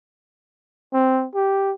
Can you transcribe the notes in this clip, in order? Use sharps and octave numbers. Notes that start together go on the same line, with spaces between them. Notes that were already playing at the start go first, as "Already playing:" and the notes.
C4
G4